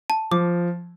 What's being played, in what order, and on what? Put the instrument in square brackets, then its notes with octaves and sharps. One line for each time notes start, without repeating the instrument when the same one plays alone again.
[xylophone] A5
[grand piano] F3 [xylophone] D6